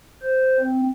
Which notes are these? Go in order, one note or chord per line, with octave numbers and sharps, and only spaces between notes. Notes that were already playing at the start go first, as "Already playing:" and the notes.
C5
C4